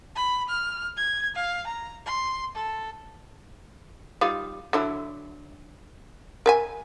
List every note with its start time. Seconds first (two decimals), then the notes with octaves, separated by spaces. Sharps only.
0.15 B5
0.48 F6
0.97 G#6
1.35 F5
1.66 A#5
2.06 C6
2.54 A4
4.21 G3 D#4 F4
4.73 D3 F#3 E4
6.46 A#4 E5 G#5